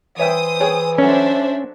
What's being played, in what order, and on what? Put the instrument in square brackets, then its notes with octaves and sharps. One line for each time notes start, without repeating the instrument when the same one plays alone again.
[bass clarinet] E3 [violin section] C5 D#6 [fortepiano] C#5 E5 G5
[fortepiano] G#4 C#5 G5
[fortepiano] F#3 A4 [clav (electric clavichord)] C#4 [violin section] D4 C5 E5